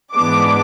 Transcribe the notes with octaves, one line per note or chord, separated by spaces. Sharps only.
G#2 E3 G#3 B3 D4 D6